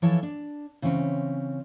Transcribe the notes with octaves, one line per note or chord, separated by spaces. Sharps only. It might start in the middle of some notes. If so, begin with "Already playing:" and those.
E3 F3 E4 A4 C#5
D4
C#3 E3 C4 C#4